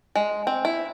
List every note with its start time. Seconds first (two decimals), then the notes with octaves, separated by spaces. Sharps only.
0.16 G#3
0.47 C4
0.65 E4